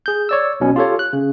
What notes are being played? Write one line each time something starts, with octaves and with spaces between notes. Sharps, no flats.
G#4 G6
C#5 D5 E6
B1 B2 C#4
F4 G4 A4 C#5
F#6
C#3